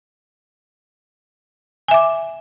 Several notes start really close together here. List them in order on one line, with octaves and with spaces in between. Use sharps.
G#5 E5 D6